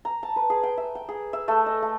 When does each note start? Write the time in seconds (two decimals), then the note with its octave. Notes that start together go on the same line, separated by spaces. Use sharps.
0.05 A#5
0.23 A5
0.36 B4
0.50 G#4
0.63 G5
0.77 E5
0.95 G5
1.09 G#4
1.33 E5
1.48 A3
1.66 D#5
1.82 A3